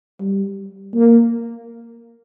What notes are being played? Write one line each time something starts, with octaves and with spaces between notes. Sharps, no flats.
G3
A#3